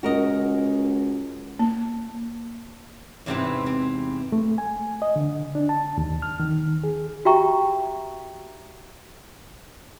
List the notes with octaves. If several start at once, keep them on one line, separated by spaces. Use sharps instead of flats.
C#2 F#4 A#4 D#5
A#3
E2 G#2 C3 E3 C4 B4
C4
A3
G#5
D#5
D3
D4
A5
D#2
F6
D#3
G#4
F#4 G4 E5 G5 A#5 C#6